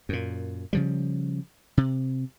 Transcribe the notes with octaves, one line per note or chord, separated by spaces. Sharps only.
F#2 A#2
C#3 F3 G3
C3